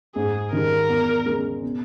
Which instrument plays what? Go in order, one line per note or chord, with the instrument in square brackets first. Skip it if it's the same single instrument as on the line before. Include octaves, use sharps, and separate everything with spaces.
[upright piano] G#2 [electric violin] G#4
[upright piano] D#3 G3 [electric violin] A#4
[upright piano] E2
C#3 G#3
B2